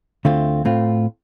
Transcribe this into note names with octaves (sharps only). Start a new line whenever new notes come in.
D2 D3 A3 C4 F4
A2 A3 C4 F4